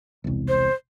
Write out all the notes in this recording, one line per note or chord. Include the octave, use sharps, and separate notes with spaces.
E1 C2
C5